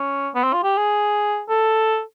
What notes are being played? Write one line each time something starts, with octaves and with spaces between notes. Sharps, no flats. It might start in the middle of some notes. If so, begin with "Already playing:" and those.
Already playing: C#4
B3
C4
F4
G4
G#4
A4